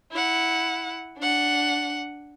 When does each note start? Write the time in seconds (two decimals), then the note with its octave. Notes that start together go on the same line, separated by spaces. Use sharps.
0.11 E4 F#5
1.18 D4 F#5